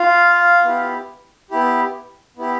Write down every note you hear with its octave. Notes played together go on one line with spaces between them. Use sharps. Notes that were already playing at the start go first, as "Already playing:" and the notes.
Already playing: F4 F5
B3 E4 G4
B3 E4 G4
B3 E4 G4